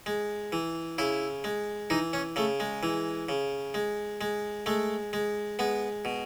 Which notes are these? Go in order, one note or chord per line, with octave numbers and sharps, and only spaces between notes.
G#3
E3
C#3 E4
G#3
E3 D#4
C#4
C#3 A3
G#3
E3
C#3
G#3
G#3
G#3 A3
G#3
G#3 B3
B2